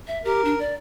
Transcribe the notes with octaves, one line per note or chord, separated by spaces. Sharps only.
E5
G4 A#4
D4
D5